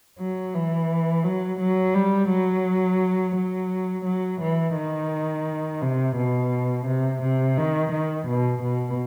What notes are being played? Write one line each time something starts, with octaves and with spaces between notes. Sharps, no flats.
F#3
E3
F#3
F#3
G3
F#3
F#3
F#3
E3
D#3
C3
B2
C3
C3
D#3
D#3
B2
B2